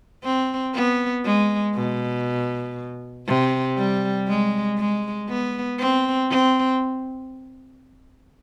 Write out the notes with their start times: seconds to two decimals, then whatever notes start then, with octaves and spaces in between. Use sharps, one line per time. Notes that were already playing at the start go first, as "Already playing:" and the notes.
0.24 C4
0.75 B3
1.25 G#3
1.75 B2
3.27 C3
3.77 G3
4.28 G#3
4.79 G#3
5.29 B3
5.79 C4
6.30 C4